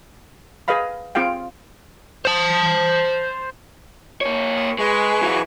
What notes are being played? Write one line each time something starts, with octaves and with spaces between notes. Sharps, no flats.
G#4 B4 D#5 F5 B5
C4 F4 G#4 F5 G5
C5 A5
A#3 C#5
F5 C6 D#6
G#3 G#4 B4 C#6
E3 F#3